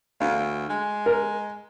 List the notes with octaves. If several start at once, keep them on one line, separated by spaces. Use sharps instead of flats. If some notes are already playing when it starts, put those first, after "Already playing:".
D2 F5
G#3
A#4